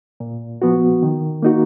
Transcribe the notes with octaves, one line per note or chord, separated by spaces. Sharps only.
A#2
F3 B3 F#4
D#3
A#3 D#4 F#4